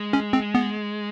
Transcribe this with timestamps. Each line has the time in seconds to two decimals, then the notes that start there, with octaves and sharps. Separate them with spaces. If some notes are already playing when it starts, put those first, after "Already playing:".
Already playing: G#3
0.13 C#4
0.33 C4
0.55 B3